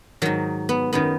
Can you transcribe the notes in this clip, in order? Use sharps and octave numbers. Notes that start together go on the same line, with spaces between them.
G#2 D#3 F#3
B3
F#2 D#3 B3